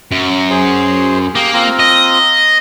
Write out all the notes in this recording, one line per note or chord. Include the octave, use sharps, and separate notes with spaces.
F#2
G#4 C5
A#3 G4 D#6
C4 F4 A#5
D#5